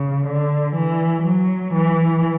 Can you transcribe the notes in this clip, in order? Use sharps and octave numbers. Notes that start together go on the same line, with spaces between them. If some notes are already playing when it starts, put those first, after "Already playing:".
Already playing: C#3
D3
E3
F#3
E3